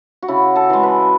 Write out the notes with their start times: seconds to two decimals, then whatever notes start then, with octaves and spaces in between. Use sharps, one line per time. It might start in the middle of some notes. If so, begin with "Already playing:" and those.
0.22 F#4
0.28 C#3 E4
0.56 A4
0.70 E3 G#3
0.83 B4